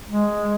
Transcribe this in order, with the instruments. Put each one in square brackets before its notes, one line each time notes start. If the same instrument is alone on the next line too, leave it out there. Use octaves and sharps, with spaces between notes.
[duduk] G#3